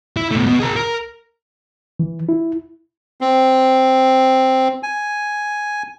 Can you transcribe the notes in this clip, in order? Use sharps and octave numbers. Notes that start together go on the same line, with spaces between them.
E4
B2 A3
B2
G#4 A#4
A#4
E3
E4
C4
G#5